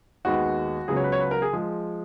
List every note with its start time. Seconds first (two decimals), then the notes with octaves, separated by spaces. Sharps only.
0.25 D#2 D#3 G#3 B3 F#4
0.88 C#2 C#3 F#3 B3 G#4
0.97 C#5
1.04 B4
1.12 C#5
1.20 B4
1.31 A#4
1.42 G#4
1.53 F3 G#3